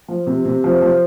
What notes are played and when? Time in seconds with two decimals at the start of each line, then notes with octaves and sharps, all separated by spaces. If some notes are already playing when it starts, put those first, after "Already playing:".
0.08 F3
0.27 C3
0.45 C3
0.64 F3
0.82 F3